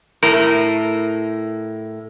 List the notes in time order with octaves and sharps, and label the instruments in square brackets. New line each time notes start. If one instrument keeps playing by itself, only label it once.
[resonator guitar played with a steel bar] A2 A#4